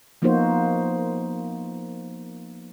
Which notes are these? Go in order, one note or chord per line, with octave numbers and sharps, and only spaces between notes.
F3 A#3 B3 D#4 F#4 C5